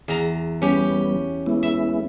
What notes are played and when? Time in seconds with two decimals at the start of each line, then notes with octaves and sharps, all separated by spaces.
0.08 E2 A#5
0.62 G3 B3 C#4 G4
1.46 G#3 B3 E4
1.63 E5